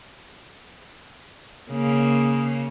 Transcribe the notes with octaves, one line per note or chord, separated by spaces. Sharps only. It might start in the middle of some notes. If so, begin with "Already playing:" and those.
C#3 A#3